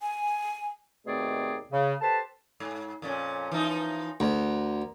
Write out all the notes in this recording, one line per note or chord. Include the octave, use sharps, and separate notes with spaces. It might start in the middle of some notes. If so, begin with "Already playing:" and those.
G#5
D#2 B2 A3 C4 G#4 D5
C#3
G4 A4 B4 C5 A5
G#2
F2 A#2 C#4
E3 F3 D#4
D2 A#4